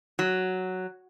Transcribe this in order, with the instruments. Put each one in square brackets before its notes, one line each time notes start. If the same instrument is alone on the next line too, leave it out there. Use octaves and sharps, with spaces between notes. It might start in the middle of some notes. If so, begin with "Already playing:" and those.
[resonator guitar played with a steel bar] F#3